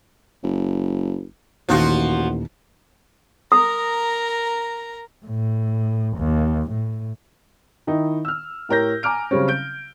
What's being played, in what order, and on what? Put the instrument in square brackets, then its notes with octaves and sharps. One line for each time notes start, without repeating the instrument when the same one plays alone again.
[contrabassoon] F#1
[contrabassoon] A1 [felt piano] D#2 A#2 [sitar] F3 F4 F#4
[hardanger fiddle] A#4 A#5 [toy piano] D#6
[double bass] A2
D#2
A2
[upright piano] D#3 D#4 E4
E6 F6
A2 G4 A#4 C#5 G6 A#6
G#5 A#5 D6 F6 D7
C#3 F#3 G3 C4 C#4
G6 D7